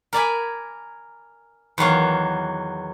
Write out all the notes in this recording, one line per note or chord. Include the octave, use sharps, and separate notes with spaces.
A#4 D5 G#5 B5
E2 D#3 F#3 F5